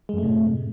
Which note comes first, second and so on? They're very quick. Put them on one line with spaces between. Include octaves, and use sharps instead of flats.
G#3 F#2 A3 C3 A2